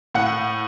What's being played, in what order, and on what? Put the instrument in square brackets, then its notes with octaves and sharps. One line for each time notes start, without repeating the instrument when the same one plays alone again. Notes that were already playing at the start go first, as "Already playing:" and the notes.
[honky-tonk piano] A2 F#5